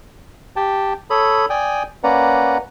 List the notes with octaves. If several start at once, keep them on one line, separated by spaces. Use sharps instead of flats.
G4 G5 A5
A4 C#5 B5 D#6
D5 G5 G#5 D#6
A#3 C#4 B4 D5 F#5 A#5